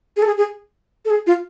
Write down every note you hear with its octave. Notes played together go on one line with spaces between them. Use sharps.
G#4
A4
G#4
G#4
A4
G#4
F4